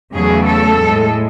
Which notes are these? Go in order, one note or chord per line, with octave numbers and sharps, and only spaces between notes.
E2 C#3 F#3 A3 G#4
A4
A2 G#3